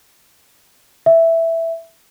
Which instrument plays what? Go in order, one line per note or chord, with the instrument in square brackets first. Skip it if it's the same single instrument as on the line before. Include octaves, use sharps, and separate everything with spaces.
[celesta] E5